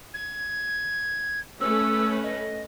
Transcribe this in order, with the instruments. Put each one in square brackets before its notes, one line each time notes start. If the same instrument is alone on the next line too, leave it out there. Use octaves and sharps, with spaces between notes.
[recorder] G#6
[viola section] A3 C#4 B4 [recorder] E6
[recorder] D#5